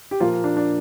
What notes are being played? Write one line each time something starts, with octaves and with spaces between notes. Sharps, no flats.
G4
A#2 F3 A#3 F4
D4
D4